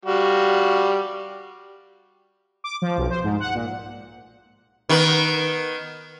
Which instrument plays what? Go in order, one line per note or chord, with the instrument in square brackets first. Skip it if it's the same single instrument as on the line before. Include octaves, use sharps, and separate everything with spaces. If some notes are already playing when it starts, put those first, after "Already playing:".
[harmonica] G3 F#4 F5
[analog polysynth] D6
F3
B1
C5
G#2
F#5
A#2
[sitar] D#3 B3